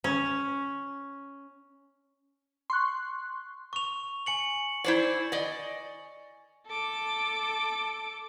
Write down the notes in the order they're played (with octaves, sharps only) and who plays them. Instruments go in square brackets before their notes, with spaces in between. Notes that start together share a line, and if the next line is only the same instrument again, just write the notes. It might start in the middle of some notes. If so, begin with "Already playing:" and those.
[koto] C#4
[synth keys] C6 C#6 F#6
[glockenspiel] C#6 F7
G#5 C#7 F#7
[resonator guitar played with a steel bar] E4 C5 D5
D5 D#5
[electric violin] A4 D6